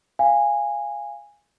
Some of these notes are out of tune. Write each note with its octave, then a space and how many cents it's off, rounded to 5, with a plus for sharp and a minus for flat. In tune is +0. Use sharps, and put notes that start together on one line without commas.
F5 -10 G#5 -15